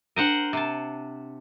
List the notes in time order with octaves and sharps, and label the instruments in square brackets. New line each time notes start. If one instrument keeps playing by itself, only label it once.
[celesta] D4 D#7 [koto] A#4 C5 F#5
[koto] C3 A5